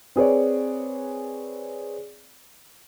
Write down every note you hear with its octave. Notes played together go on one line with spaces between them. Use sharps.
C4 G#4 B4 C#5 D5